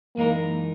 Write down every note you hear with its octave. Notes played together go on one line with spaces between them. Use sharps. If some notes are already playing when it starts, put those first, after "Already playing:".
F#2 E3 G#3 A#3 D#4 A#4